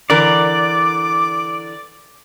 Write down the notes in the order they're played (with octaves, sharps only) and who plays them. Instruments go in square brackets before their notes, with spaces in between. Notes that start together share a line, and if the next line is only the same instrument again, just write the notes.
[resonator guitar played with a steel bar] D3 E3 A#4 [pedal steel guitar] D5 [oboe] D6